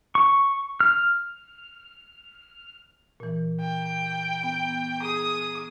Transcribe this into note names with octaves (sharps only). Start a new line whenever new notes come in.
C#6
F6
A#2 E3
G5
B3
G#4 D#6